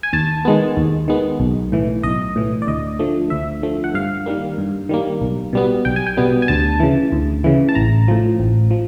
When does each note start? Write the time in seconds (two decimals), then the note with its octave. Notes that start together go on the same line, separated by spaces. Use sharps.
0.03 G#5
0.13 D#2 A5
0.45 D#3 G#3 B3
0.77 D#2
1.08 D#3 G#3 B3
1.40 B1
1.72 A2 E3
2.03 B1 D#5
2.36 A2 E3
2.62 D5
2.67 D2 D#5
2.99 D3 F3 A3
3.30 D2 E5
3.63 D3 F3 A3
3.84 F#5
3.94 G2 F5
4.26 D#3 G3 A#3
4.58 G2
4.89 D#3 G3 A#3
5.21 B1
5.53 B2 G3 B3
5.85 B1 G5
5.96 G#5
6.07 G5
6.17 B2 G3 B3
6.42 G#5
6.48 D2 A5
6.80 C#3 E3
7.12 D2
7.44 C#3 E3
7.69 A5
7.75 A1 A#5
8.08 A2 F3
8.39 A1
8.71 F3